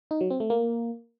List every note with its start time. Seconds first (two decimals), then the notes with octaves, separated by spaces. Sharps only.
0.11 D#4
0.21 F#3
0.30 C4
0.40 A3
0.50 A#3